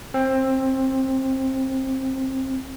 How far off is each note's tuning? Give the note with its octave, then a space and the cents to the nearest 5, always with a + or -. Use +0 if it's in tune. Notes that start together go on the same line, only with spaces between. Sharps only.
C4 +20